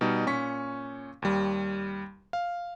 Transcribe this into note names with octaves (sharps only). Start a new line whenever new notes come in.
B2 G3 D#4
A#2 C#4 C#6 B6
D#2 G3
F5